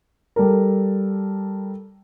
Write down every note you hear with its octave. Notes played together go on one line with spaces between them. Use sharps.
G3 A4 A#4